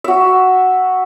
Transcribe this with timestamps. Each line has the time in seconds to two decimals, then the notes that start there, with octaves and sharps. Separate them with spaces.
0.04 F#4 E5